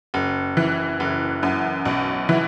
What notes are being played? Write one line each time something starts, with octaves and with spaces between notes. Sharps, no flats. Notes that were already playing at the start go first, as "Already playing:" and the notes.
F#1
E3
F#1
F#2
B1
E3